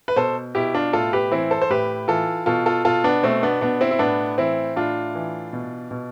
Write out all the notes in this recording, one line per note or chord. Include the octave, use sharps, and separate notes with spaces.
B4
B2 A4 C5
B2 E4 G4
D4 F4
A2 F4 A4
G4 B4
E3 C4 E4
A4 C5
C5
A2 G4 B4
E3 F4 A4
B2 F4 A4
F4 A4
B2 F4 A4
B3 D4
B2 A3 C4
B3 D4
B2 B3 D4
C4 E4
E4
A2 B3 D4
E3 C4 E4
A2 D4 F4
E3
B2
B2